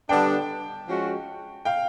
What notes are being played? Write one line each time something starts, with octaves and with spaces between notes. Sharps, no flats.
D3 G3 B3 D4 G5 A5
F3 G#3 C#4 F#4
F5 G5